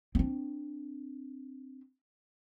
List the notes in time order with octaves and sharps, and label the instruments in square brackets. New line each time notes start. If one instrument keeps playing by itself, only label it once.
[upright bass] C4 D4